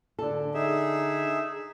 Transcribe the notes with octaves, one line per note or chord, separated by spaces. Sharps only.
D3 A4
D#4 G#4 E5